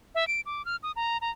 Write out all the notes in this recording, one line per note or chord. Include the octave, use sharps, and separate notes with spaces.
E5
D7
D6
F6
D#6
A#5
A#5